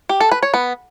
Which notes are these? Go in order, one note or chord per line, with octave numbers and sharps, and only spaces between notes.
G4
A4
B4
C#5
B3